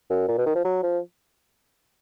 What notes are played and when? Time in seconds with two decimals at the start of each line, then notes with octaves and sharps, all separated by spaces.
0.10 F#2
0.28 A#2
0.38 B2
0.46 D#3
0.55 F3
0.65 F#3
0.83 F3